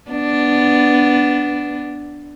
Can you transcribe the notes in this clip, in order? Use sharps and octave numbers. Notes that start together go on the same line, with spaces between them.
B3 D4